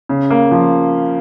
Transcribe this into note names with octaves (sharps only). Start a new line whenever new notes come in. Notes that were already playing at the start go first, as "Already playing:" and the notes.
C#3
A#3
F3